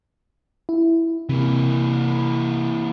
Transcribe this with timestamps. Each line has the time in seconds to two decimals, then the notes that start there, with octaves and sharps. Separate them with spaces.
0.69 E4
1.29 C3 E3 A#3